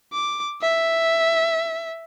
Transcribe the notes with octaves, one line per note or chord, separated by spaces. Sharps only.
D6
E5